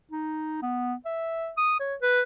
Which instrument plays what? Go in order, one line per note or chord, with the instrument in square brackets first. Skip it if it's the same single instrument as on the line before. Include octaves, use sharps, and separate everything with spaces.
[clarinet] D#4
B3
E5
D#6
C#5
B4